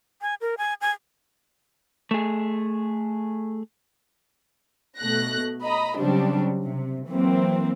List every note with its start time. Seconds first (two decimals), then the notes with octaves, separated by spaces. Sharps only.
0.22 G#5
0.41 A#4
0.58 G#5
0.81 G#5
2.11 A3 G#4
4.98 B2 A3 F#6 A#6
5.63 D#5 A#5 B5
5.98 C#3 F#3 G3 C4 D4
6.65 C3
7.08 E3 F#3 A#3 C4